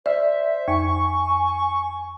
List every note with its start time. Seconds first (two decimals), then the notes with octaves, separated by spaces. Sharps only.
0.06 C5 D5 E5
0.68 F2 G#5 C#6